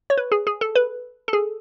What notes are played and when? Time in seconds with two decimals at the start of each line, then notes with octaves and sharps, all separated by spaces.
0.10 C#5
0.18 B4
0.32 G#4
0.47 G#4
0.61 A4
0.75 B4
1.28 A4
1.33 G#4